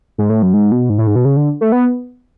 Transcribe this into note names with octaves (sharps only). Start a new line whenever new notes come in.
G#2
A2
F#2
G#2
B2
G#2
A2
G#2
B2
C#3
D3
A3
B3